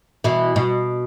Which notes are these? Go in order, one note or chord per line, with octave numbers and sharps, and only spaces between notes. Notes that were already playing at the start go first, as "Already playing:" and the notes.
B2 E3
B2